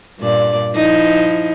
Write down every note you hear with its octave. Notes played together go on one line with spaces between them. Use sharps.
G2 A#2 D5
F3 D#4 E4